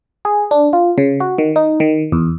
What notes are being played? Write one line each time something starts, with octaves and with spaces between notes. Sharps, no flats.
G#4
D4
F4
C#3
F#4
D#3
D#4
D#3
E2